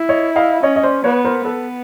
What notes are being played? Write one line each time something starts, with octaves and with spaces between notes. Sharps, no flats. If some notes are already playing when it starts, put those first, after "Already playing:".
Already playing: E4
C#5 D#5
D#5 F5
C#4 C#5 D#5
D#5
C5 D5
B3 B4 C#5
A#4 C5
B3 A4 B4